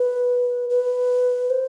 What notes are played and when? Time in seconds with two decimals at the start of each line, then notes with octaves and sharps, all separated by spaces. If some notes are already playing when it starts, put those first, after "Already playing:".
Already playing: B4
0.70 B4
1.50 C5